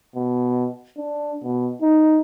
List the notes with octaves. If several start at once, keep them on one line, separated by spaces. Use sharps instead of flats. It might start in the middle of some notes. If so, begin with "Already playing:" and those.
B2
D4
B2
D#4